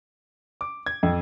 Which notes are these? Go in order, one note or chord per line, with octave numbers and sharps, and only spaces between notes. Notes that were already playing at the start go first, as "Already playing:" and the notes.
D6
G#6
F2